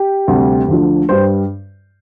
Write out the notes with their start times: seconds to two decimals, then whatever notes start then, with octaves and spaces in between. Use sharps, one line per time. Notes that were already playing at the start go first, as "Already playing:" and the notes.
Already playing: G4
0.28 D2 C3 G3
0.68 D2 D3 F3
1.09 G2 G3 C5